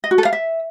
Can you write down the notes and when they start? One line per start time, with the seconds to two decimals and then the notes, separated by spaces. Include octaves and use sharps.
0.04 D#5
0.11 F#4
0.18 A4
0.25 F5
0.33 E5